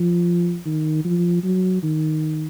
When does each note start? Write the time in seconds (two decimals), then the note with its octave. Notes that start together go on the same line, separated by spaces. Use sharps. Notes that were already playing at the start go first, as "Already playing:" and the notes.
Already playing: F3
0.65 D#3
1.05 F3
1.44 F#3
1.83 D#3